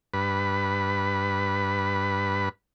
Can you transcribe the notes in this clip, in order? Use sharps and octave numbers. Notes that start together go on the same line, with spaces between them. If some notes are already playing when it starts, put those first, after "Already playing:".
G2 B4